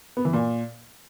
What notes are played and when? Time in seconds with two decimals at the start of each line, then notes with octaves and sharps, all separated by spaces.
0.17 B3
0.25 E3
0.33 A#2